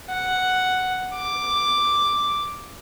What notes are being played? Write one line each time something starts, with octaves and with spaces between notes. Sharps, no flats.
F#5
D6